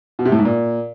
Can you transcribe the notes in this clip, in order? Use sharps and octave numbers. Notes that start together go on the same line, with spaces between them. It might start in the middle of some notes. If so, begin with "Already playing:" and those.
B2
C3
A2
G#2
A#2